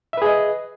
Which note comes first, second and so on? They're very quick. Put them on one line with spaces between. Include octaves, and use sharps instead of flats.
E5 B4 G#4 D#5